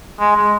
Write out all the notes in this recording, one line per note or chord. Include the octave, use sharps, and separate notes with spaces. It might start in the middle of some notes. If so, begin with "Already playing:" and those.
G#3
G#3